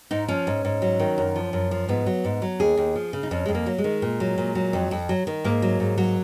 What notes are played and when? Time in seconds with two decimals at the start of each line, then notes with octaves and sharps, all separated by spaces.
0.11 G#2 D#4
0.28 F3 C#4
0.47 G#2
0.65 G#2
0.82 F#3
0.99 D#3
1.18 F#2
1.36 F3
1.53 F#2
1.71 F3
1.89 G#2 B3
2.06 F#3
2.25 G#2
2.42 F#3
2.60 D#2 G#4
2.77 D#2
2.95 F3
3.13 C#3
3.23 D#4
3.31 F2 C#4
3.46 F2 G#3
3.55 A#3
3.66 F#3
3.78 G#3
3.84 D#3
4.02 A#2
4.20 F#3
4.38 A#2
4.55 F#3
4.73 F2
4.91 F2
5.09 F#3
5.27 D#3
5.44 G#2 A#3
5.62 F#3
5.80 G#2
5.98 F#3